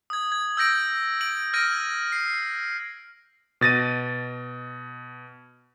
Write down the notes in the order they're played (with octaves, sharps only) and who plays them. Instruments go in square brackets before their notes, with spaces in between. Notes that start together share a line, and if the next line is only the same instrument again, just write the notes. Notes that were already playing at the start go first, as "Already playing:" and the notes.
[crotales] D#6 G#6
G#6
E6 G6 A#6 D7 F#7
D7 F#7
F6 G#6 A#6 D7 D#7
C7
[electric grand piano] B2 A6 A#6 D#7